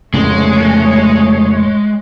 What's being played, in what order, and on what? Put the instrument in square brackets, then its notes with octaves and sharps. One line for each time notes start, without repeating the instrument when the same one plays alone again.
[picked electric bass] F1 A2 C#3 [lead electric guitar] G#3 [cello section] A3 C#5